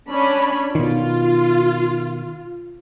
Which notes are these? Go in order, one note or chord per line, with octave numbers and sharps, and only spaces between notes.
C#4 D4 B5
B2 D#3 F4